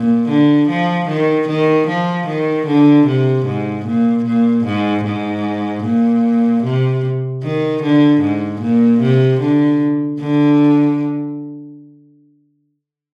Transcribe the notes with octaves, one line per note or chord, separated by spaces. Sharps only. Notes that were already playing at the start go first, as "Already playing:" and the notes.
Already playing: A#2
D3
F3
D#3
D#3
F3
D#3
D3
C3
G#2
A#2
A#2
G#2
G#2
A#2
C3
D#3
D3
G#2
A#2
C3
D3
D3